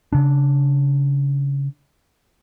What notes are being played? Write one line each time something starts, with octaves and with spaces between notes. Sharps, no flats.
C#3 D4